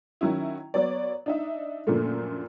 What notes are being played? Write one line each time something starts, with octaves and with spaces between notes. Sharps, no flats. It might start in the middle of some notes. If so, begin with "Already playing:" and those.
D#3 F#3 C#4 E4
F#3 B3 C#5 D5
D4 D#4 E5
F#2 A#2 D3 F3 A3 A#3